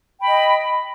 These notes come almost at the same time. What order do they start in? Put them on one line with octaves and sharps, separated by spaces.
G5 B5 D#5